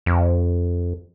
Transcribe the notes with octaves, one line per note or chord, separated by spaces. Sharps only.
F2